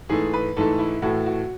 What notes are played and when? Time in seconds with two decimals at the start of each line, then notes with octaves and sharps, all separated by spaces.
0.09 G#2 E3 A3 G#4
0.33 B4
0.57 G#2 E3 A3 A4
0.79 E4
1.02 A2 E3 A3 F#4
1.26 F#4